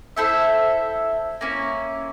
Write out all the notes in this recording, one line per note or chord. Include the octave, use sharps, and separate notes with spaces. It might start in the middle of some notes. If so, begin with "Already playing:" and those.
E4 A4 C5 E5
A#3 C#4 E4